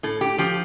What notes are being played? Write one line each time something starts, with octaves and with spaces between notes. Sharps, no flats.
A2 A4
G4
F3 G4